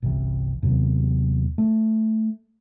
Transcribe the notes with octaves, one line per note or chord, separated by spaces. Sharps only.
G1 C2 E3
D#2 C3 F#3 B3
A3